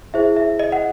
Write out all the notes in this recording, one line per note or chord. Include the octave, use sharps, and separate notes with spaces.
E4 G#4 C5 E5
E5
D#5
F#5